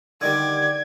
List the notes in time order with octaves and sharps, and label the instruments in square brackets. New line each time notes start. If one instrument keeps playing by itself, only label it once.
[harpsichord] D3 D#3 G3 [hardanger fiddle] D5 [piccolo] G#6